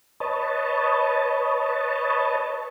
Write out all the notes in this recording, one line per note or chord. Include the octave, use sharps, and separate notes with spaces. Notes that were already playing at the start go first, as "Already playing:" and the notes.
B4 C#5 D#5 A5